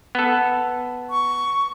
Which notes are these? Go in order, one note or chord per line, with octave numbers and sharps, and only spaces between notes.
B3 A4
C#6